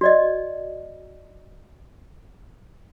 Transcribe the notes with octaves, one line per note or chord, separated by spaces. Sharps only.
F#4 D5 D#5